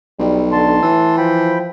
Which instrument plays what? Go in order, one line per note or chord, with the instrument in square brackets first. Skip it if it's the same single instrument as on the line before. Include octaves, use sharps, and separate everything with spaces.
[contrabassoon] B1 [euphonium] G3
[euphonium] D3 [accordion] A5 C6
[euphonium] A2 [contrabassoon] E3
[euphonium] F3 [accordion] G5 B5